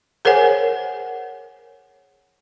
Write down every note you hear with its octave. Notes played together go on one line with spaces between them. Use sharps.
G#4 A#4 C5 C#5 F#5 G#5